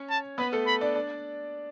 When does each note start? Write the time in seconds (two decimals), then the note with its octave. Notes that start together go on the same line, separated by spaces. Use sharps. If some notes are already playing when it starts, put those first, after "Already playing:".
Already playing: C#4 C#5
0.10 A5
0.38 B3 B4 B5
0.52 A3 A4
0.67 B5
0.81 D4 D5
0.95 D4 D5